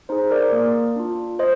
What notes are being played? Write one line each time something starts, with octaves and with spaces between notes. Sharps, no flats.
D#4 G#4 C5
A#4 D5
A#3
D4 F4
C5 D#5